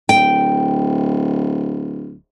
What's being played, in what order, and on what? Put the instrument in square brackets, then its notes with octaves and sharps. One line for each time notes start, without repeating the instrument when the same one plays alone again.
[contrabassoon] D1 [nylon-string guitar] G5